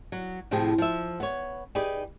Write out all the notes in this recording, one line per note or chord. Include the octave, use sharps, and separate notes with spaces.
F#3
A2 C3 F3 G4 G#4
F3 E5
B3 C#5
D#4 G4 G#4 B4 D5